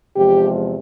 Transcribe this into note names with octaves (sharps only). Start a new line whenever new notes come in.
E2 C3 F3 G#3 G4